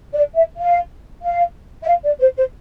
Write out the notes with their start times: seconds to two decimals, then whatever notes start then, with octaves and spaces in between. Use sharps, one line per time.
0.13 D5
0.35 E5
0.57 F5
1.22 F5
1.83 E5
1.87 F5
2.04 D5
2.20 C5
2.37 C5